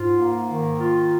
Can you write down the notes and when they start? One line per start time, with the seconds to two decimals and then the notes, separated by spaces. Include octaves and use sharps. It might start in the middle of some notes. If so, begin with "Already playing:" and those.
Already playing: G#2 F4
0.19 A#3
0.49 D#3
0.80 F4